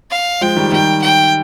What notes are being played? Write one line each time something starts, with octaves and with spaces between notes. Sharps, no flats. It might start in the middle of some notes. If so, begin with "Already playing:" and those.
F5
F3 G#3 G5
D#3 G3
D#3 G3 G5
G5